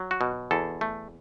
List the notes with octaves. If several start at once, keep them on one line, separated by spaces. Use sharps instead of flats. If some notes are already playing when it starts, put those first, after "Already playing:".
Already playing: F#3
F#4
B2
E2 A4
A3